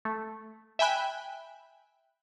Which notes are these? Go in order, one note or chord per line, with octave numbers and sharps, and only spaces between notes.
A3
E5 G5 G#5 B5 F#6